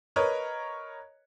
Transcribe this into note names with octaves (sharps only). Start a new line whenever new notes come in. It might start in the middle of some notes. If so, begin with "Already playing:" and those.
A#4 B4 C#5 D#5